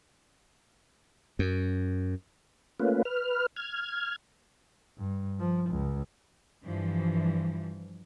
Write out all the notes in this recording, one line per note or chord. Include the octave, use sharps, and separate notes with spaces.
F#2
A3 A#3 C#4 F4 B4
B4 F6
F6 G#6
G2
F3
C#2
G2 E3 F3